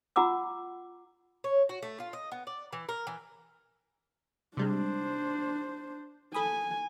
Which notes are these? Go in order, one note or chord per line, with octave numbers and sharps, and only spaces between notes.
F4 F#5 A#5 D6 E6
C#5
F#4
A3
F4
D#5
B3
D5
E3
A#4
E3
C3 G3 G#3 D4 C5
A4 G#5 B5 D#6